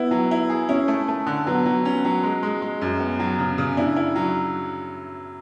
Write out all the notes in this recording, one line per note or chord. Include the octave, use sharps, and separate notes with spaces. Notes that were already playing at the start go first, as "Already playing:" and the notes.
Already playing: B3 E4
F#3
E4
G#4
C#4 E4
A3
A3
D3
F#3 B3
F#3
C#4
F#3
G#3
G#3
G#3
F#2
B3
F#3
C#3
C#3
D4 E4
E4
F#3